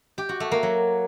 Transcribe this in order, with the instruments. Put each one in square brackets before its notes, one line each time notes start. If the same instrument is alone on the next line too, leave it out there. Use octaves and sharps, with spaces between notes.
[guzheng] G4
F#4
A3
A#3
F#3